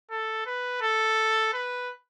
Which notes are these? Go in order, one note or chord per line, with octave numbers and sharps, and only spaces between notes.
A4
B4
A4
B4